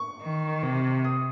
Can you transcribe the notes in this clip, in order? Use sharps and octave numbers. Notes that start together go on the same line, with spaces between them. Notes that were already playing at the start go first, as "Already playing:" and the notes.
Already playing: C#6
D#3
C3
D#6